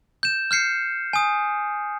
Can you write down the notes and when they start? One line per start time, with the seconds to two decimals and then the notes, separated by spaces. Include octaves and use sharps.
0.23 G6 E7
0.51 F6 G6 C7 C#7
1.13 G#5 D#6